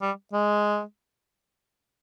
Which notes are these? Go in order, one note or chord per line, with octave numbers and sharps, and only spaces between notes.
G3
G#3